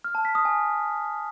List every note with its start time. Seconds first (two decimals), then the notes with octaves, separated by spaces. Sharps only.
0.04 F6
0.15 A5
0.25 B6
0.35 D#6
0.45 G#5